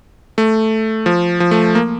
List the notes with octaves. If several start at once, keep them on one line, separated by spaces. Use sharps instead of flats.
A3
F3
F3
A3
A#3